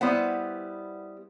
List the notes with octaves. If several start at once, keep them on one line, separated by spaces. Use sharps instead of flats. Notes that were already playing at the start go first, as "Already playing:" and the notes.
G3 B3 E4 B4 C5 F#5